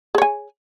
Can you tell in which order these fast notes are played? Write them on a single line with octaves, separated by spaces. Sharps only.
G#4 C#5 G#5